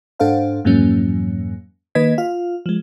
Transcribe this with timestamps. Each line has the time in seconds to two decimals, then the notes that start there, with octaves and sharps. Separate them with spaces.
0.19 G#2 D4 A4 C5 F5 F#5
0.65 F2 G#2 E3 F#3 A#3 C#4
1.95 D#3 A#3 B4 D#5 G#6 B6
2.18 F4 F5
2.66 F3 G#3